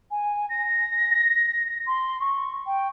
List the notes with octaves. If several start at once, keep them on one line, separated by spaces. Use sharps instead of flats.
G#5
A#6
C6
C#6
G5